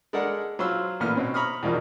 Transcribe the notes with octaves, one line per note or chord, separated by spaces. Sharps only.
G#3 D4 A4 A#4 F#5
F#3 F4 C5 C6 E6
A1 A#2 B3 F6
B2 C4 C#4
A#5 B5 C#6 D#6 F6
E2 G2 B2 D#3 F3